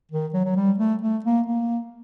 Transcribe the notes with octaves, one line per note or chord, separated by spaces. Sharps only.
D#3
F#3
F#3
G3
A3
A3
A#3
A#3